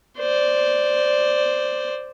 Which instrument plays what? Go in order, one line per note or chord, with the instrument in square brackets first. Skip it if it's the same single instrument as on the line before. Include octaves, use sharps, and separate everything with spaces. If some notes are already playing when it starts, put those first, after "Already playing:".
[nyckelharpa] C5 D5